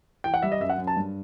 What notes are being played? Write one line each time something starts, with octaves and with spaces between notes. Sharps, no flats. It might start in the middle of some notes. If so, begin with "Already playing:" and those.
E3 G5
F#5
G3 E5
D#5
F#2 E5
F#5
F#2
A5
G2